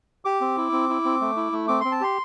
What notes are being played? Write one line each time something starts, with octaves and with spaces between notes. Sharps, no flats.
G4 D6
C4
E4
C4
E4
C4
A3
E4
A3
C4 D6
C4 C6
A5
G4 C6